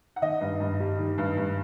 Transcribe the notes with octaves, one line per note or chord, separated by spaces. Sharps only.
F#5
D#3 D#5
G2
G2
G3
D#3
G2
G2